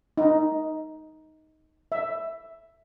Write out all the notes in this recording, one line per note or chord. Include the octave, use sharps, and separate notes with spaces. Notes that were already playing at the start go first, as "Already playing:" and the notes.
D#4
E5